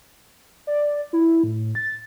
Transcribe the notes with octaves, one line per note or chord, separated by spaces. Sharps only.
D5
E4
A2
A6